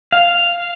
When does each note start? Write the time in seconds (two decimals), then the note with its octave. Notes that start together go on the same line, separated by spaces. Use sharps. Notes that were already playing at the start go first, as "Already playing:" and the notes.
0.12 F5